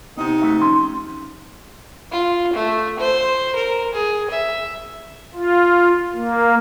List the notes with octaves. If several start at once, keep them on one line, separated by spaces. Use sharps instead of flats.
C3 B3 D#4
A3 F#4 E5
F3 C#4 C6
F4
A3
C5
A#4
G#4
E5
F4
A#3